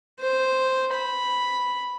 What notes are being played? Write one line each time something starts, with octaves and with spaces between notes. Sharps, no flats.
C5
B5